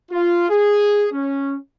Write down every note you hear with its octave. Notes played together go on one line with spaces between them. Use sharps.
F4
G#4
C#4